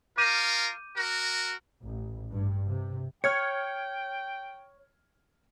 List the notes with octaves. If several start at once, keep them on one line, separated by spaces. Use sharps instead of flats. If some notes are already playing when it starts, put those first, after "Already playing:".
F4 A#4 D6 G6 D#7
F#4 A#4
A1
G2
C3
C#5 G5 F6 G#6 C#7